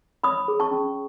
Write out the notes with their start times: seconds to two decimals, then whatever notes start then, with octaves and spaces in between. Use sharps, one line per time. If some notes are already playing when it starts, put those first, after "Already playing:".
0.24 C#5 B5 D#6
0.48 G#4
0.60 A5 C#6
0.71 C#4